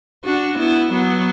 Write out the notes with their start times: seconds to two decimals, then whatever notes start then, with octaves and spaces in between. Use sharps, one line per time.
0.25 D4 F#4
0.59 B3 E4
0.92 F#3 B3